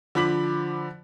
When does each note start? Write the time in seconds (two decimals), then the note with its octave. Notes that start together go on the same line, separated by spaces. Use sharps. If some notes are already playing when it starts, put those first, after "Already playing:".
0.15 D3 F3 B5 D6 B6 F#7